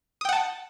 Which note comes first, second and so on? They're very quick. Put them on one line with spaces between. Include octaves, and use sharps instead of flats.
D#6 G5 F#5 A5